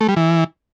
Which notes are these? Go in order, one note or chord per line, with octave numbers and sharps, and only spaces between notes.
A3
G3
E3